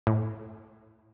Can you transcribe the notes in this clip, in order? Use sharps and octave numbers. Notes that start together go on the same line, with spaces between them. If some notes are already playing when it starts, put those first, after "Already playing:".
A2